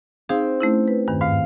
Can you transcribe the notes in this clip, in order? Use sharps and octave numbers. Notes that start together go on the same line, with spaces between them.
C4 D#4 G#4 F5
A3 C#4 E4
B4
E2 G2 D#3
G#2 F5